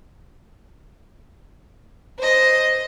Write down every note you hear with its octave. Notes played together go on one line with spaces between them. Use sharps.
C5 D#5